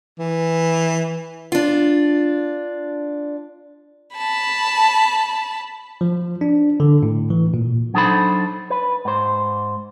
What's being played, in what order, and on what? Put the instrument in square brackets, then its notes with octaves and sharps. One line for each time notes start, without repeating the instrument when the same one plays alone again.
[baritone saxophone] E3
[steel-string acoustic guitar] D4 F4
[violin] A5 B5
[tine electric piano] F3
D4
D3
A2
E3
A#2
[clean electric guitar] F#3 D4 D#4 A4 C5 B5
B4
G#2 C5